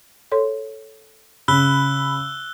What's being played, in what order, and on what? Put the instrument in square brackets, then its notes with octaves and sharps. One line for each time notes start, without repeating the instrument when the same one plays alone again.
[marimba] A4 C#5 C6
[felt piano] C#3 [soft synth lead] B5 [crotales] E6 F#6 G7